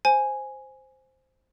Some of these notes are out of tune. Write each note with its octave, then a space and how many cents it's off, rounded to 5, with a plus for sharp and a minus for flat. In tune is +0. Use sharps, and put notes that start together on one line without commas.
C5 +0 G#5 +0